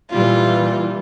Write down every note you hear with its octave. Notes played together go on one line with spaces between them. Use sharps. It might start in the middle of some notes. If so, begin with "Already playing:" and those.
A#2 E3 G3 F4